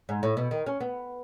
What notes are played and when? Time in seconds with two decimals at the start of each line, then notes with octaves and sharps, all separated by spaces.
0.09 G#2
0.23 A2
0.37 B2
0.51 D#3
0.66 C#4
0.80 B3